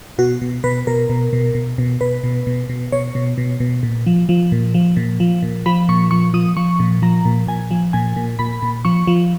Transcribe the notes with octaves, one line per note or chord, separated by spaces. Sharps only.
B2 F#4
B2
B2 B4
B2 A#4
B2
B2
B2
B2
B2 B4
B2
B2
B2
B2 C#5
B2
B2
B2
A#2
F3
F3
A#2
F3
A#2
F3
A#2
F3 B5
A#2 C#6
F3 C#6
F3 D#6
F3 C#6
A#2
F3 A#5
A#2
A#2 G#5
F3
A#2 G#5
A#2
A#2 B5
A#2
F3 C#6
F3